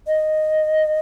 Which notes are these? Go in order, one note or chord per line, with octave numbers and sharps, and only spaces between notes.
D#5